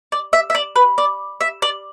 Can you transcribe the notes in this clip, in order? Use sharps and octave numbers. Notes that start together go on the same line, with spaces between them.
D5
E5
E5
D5
B4
D5
E5
D5